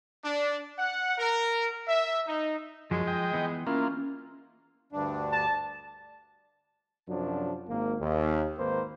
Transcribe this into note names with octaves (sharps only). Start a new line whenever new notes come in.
D4
F#5
A#4
E5
D#4
F#2 F3 G#3
D#5 G5
E3 B3
A#3 C#4 E4 F4
D2 G2 D4
A5
F#2 C3 F3 F#3 D4
G#1 A#3
D#2
G#1 D#3 A#3 B4 C5